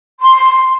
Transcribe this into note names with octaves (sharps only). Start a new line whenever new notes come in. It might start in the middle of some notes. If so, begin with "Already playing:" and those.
C6